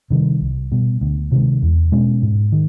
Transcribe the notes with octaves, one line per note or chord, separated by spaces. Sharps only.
C3 D#3 G3
C2
B2 G3
D2
C3 D#3 G#3
E2
B2 G#3 C#4
G#2
D#3